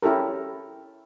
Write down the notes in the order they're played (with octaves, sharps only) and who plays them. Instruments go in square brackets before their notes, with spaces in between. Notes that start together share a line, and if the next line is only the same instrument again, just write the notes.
[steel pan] C#4 E4 G4 A4 A#4